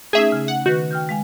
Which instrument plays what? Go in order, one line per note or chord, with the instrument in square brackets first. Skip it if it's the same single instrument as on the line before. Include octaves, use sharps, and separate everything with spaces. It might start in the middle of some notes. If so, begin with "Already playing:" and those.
[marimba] A3 C#4 D#4 [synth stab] G#4 E5
[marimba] C#3
[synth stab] F#5
[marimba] D#3 B4 [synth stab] F#4
[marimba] G5 F6 G6
G#3 F5 G#5